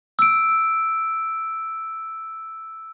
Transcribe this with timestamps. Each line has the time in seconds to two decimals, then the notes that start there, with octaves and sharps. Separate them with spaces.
0.19 E6 D7